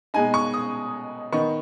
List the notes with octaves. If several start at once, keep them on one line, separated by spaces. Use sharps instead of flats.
B2 G#3 D#4 G#5
C#6
D#6
D#3 B3 D#4 C#6